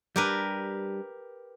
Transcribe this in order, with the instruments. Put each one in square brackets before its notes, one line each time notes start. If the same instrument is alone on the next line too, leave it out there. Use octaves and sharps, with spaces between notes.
[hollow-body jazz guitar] G3 D4 [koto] G4 A#4 B4